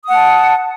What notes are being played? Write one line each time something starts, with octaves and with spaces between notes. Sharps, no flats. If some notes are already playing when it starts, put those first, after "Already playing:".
F#5 A5 D#6